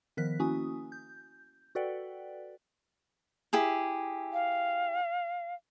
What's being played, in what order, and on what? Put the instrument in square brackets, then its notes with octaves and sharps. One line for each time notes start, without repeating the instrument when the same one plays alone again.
[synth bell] D#3 F3 B3 A#4 F#6 B6
A#3 C#4 E4 F#4 G#5 D#6
G6
F#4 A4 B4 D5 F#5 G5
[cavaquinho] E4 G4 G#4
[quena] F5